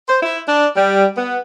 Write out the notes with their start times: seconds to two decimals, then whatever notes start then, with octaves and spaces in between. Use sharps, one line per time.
0.08 C5
0.22 E4
0.47 D4
0.76 G3
1.17 B3